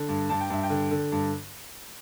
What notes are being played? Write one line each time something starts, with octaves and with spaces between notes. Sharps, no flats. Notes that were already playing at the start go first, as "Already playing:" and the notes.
Already playing: D3
G2
G2 A5
G5
G2 E5
G5
D3
D3
G2